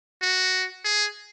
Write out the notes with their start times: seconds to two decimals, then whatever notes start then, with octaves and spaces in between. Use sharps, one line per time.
0.22 F#4
0.85 G#4